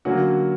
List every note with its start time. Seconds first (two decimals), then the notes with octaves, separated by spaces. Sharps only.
0.05 D3 F#3 A#3 C#4 F#4